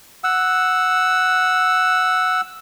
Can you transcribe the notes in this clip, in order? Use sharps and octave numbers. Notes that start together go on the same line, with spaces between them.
F#5 E6